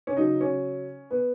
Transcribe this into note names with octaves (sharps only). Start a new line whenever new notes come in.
C#4
C#3 F#3 D#4
C#4
B3